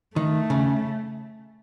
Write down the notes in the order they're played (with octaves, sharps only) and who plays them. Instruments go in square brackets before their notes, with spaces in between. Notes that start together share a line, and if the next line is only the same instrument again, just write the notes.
[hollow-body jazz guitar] D#3 [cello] A3
[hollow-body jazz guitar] C#3